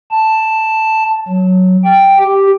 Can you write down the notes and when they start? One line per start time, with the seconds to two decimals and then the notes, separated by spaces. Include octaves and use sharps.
0.11 A5
1.28 F#3
1.84 G5
2.19 G4